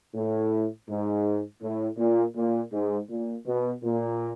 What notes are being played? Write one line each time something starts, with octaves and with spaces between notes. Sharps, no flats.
A2
G#2
A2
A#2
A#2
G#2
A#2
B2
A#2